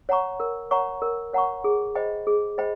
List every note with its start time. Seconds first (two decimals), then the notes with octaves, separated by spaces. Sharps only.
0.09 C#5 F#5 A#5 C#6
0.40 A#4
0.71 C#5 F#5 A#5 C#6
1.02 A#4
1.34 C#5 F#5 A#5 C#6
1.64 G#4
1.95 C5 D#5 G5 B5
2.27 G#4
2.58 C5 D#5 G5 B5